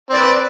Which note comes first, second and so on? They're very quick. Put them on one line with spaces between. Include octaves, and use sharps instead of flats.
C4 D5 B4